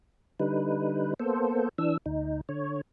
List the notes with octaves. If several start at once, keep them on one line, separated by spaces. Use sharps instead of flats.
D3 G3 D#4 B4
A#3 B3 A4 C5
E3 D4 E6
D2 D#4
D3 C#5